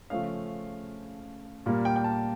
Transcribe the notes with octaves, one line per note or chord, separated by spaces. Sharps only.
C#3 F3 A3 C#4 F5
A#2 G3 A#3
G5
G5
A5